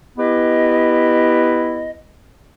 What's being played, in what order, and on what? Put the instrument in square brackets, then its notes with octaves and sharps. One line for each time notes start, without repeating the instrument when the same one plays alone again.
[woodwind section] B3 E4 G4 B4 D#5